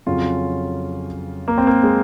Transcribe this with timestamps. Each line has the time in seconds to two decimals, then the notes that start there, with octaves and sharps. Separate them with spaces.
0.06 F2 C#3 F#3 C#4 F4
1.48 A#3
1.58 C4
1.67 A#3
1.84 G#3